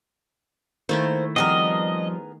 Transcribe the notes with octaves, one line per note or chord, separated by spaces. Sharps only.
D#3 A3 A#3 E4 C5
F3 G3 B3 C4 G#4 A#4 D#5